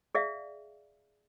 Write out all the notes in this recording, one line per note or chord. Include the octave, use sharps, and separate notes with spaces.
G#4 D5 E5 F5